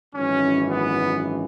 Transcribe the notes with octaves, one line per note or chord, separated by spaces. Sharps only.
G#1 F#2 E3 C#4
B3